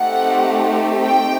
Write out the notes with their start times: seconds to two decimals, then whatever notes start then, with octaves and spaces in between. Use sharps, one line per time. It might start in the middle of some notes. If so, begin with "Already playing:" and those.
Already playing: A3 C4 D#4 G4 F#5
1.05 G5